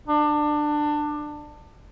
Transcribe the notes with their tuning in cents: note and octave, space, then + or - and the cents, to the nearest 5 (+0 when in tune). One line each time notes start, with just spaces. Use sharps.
D4 +20